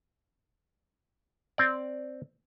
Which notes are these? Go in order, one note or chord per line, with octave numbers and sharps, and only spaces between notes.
C4 D5